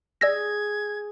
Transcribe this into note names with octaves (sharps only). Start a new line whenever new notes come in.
G#4 D5 E6 G#6 A#6